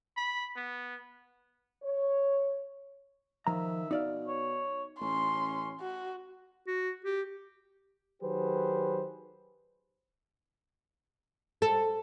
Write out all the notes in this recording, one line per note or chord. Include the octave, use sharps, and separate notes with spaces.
B5
B3
C#5
D#3 F3 E5 A#5
B2 D#4 D5 F5
C#5
A1 C#4 C6
F#4
F#4
G4
D#3 F#3 G4 G#4 B4 C5
A4